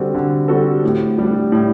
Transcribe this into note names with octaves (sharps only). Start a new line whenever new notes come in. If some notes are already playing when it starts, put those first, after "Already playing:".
Already playing: D3 G3 C4 F#4 A4
D3
G3 C4 F#4 A4
A2
G3 D4
A2